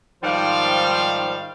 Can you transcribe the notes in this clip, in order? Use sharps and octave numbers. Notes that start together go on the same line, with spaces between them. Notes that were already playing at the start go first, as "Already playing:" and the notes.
G#2 D#3 F3 G3 C5 F5